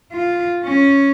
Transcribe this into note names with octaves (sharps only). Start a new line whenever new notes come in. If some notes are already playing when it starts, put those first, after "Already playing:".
F4
C#4